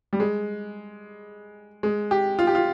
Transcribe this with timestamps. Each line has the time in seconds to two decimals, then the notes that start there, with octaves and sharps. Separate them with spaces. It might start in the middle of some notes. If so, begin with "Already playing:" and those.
0.13 G3
0.20 G#3
1.83 G#3
2.11 G4
2.39 F4
2.47 G4
2.55 F4